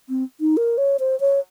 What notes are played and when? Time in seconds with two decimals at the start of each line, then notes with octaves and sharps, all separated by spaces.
0.09 C4
0.40 D#4
0.57 A#4
0.78 C#5
0.99 C5
1.20 C#5